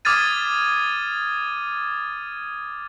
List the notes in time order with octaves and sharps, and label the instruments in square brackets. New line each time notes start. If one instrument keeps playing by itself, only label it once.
[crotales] D6 D#6 F6 G#6 A6 D#7